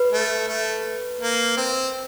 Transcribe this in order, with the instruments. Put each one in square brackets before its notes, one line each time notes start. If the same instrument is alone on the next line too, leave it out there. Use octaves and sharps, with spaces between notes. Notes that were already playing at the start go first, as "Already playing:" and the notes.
Already playing: [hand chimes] B4
[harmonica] A3
A3
A#3
C4